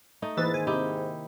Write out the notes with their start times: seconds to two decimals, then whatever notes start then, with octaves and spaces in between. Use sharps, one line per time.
0.22 A3 D#4
0.37 G#2 E3 A#3 G#4 B4 E5 A6
0.54 D#3 C5 G#5
0.67 C3 D#4 E4 G4